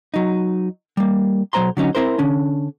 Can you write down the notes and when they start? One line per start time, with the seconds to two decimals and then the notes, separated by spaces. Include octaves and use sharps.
0.14 F#3 D#4
0.97 G3 A#3
1.53 B1 F#3 A#3 C5 A#5 C6
1.77 D3 F#3 C#4 D#4
1.95 C4 E4 A#4 C5
2.18 D3 C#4 D4